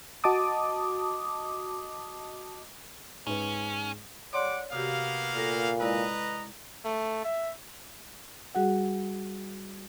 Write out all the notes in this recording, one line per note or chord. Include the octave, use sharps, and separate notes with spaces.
F#4 D#5 A5 D6 D#6
G#2 C#4 B4
G3 C#5 D5 F#5 C6 D6
C3 A#3 B3 F#4 G4 F5
A#2 A4 F6 A#6
G#3 E4 B4 D5 D#5 A#5
A3
E5
G3 F#4 G#4 F#5